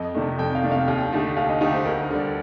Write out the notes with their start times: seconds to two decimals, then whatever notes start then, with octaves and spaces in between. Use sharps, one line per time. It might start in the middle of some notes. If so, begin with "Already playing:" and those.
Already playing: F2 D#5
0.14 C3 D#3 A3 D4
0.38 F2 G5
0.55 F5
0.63 C3 D#3 A3 D4
0.72 F5
0.87 D#2 G5
1.12 D3 A3 D#4 G4
1.36 D#2 F5
1.49 D#5
1.61 D3 A3 D#4 G4
1.73 C5
1.85 D2 A#4
2.11 D3 G3